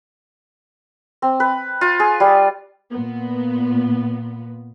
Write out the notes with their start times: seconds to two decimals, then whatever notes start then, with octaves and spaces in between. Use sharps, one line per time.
1.22 C4
1.40 B4
1.81 F4
2.00 G#4
2.20 G3
2.91 A#2 B3